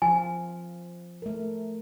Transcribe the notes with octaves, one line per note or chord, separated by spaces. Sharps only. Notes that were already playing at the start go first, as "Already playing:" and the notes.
F3 F4 G#5
A3 A#4